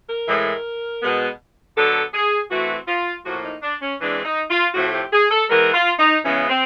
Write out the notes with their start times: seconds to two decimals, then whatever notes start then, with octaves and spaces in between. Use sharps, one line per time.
0.09 A#4
0.28 A2 E3 G#3
1.02 B2 G#3 B3
1.76 D3 F#3 B3 A4
2.14 G#4
2.51 E3 A3 C4 F#4
2.88 F4
3.26 A2 F3 A#3 F#4
3.44 D#4
3.63 D4
3.82 C#4
4.00 E3 G#3 C4 D4
4.25 D#4
4.50 F4
4.74 A2 F3 A3 C4 F#4
4.93 G4
5.13 G#4
5.31 A4
5.50 E3 G#3 B3 A#4
5.74 F4
5.99 D#4
6.24 C#3 E3 G#3 B3 C#4
6.50 C4